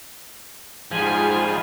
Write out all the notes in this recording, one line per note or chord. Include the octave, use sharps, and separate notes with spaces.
G#2 F3 G3 F4 G#4 G#5